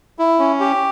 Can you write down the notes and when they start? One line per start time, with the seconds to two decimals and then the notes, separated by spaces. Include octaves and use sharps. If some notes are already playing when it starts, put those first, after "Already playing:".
0.19 E4
0.39 C#4
0.60 G4